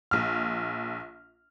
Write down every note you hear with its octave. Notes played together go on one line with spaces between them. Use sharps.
A#1 F6